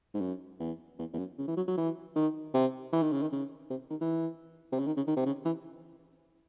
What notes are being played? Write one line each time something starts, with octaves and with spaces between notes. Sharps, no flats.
G#2
F#2
E2
E2
E2
F#2
C#3
E3
F#3
F#3
E3
D#3
C3
E3
D#3
C#3
D#3
C#3
C3
D#3
E3
C3
C#3
D#3
C#3
D#3
C3
C#3
E3